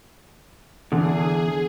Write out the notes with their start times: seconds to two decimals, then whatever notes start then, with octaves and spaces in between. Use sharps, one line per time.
0.92 E2 D3 G#4